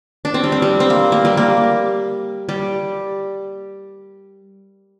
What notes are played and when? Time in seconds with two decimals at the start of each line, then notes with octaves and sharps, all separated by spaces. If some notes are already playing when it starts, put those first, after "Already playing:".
0.25 D4
0.34 C4
0.44 G3
0.52 C4
0.62 G3
0.80 C4
0.90 A#3
1.12 A#3
1.25 G3
1.37 A#3
2.49 G3